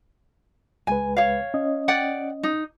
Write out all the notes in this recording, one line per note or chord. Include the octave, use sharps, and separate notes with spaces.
C#2 G#3 B4 G#5
C#5 F5
C#4 D#5
D5 F#5 G5
D#4